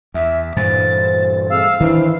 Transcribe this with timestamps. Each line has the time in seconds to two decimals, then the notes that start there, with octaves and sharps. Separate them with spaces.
0.14 E2 E5
0.57 D2 G2 A#2 E3 C5 A6
1.49 G#3 A3 C4 F5 E6
1.80 D#3 E3 C4 D4 C5